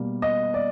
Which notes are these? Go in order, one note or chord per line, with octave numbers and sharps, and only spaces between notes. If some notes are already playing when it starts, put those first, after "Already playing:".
Already playing: B2 G3 A#3
D#5
D5